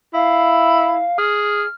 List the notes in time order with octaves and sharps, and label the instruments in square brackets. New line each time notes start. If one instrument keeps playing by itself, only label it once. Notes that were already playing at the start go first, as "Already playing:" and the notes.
[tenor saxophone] E4 [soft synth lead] F5
[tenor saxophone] G#4 [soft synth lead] F6